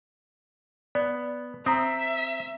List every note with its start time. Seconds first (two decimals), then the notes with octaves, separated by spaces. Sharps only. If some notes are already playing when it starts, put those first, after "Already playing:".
0.95 B3 D5
1.66 C4 E5 A#5 D#6